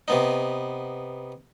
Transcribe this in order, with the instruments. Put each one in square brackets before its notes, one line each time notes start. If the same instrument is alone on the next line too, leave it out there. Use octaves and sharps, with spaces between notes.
[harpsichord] C3 B3 D#4